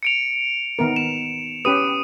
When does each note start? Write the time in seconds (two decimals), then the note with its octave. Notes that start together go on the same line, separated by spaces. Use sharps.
0.03 C#7 D7 F7
0.79 D#3 B3 A#4
0.96 E7
1.65 C#4 G4 B4 D#6 D#7